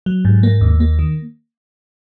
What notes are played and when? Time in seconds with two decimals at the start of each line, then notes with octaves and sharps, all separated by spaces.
0.06 F#3
0.25 G#2
0.43 A#3
0.61 D#2
0.80 A#3
0.99 D#3